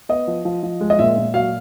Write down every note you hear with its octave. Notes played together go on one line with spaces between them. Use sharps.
B3 D#5
F3
F3
F3
G#3
D#5
A#2 E5
A#2
F#3 F5